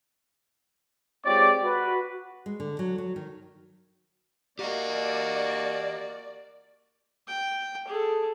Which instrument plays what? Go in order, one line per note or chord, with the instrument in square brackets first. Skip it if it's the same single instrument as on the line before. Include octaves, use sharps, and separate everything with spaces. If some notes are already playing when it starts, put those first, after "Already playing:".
[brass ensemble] G#3 C4 F4 G4 C#5 D5
F#4 B4
[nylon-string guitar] G#3
D3
F#3
F#3
D#3
[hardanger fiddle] A#3 F#4 [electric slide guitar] G4 D#5 [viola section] D5
[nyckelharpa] G5
G#4 A4